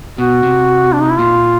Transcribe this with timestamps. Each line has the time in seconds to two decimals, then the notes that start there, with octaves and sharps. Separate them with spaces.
0.18 B2 F#4
0.43 C3
0.93 D4
1.02 D#4
1.10 E4
1.19 A#2 F4